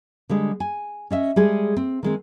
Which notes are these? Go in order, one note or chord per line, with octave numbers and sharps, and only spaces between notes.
D3 G3 G#3
G#5
C#4 D#5 E5
G3 G#3 G#4 A4
C4
D#3 G#3 C4